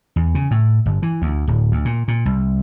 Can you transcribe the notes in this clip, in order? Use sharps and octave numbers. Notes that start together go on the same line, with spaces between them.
E2
C#3
A2
G1
E3
D2
D1
D2
A#2
A#2
C2